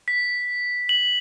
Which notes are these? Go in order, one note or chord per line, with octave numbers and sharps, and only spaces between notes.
B6
F#7